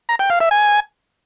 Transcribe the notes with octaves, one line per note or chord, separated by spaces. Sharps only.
A#5
G5
F5
E5
G#5